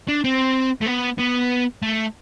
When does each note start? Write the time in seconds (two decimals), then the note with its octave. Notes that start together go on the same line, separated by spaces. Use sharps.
0.08 D4
0.24 C4
0.83 A3
0.88 B3
1.19 B3
1.83 A3